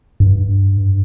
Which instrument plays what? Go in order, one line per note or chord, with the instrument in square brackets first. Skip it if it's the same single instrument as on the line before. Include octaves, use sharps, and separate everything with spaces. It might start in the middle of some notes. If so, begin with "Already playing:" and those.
[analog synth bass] G2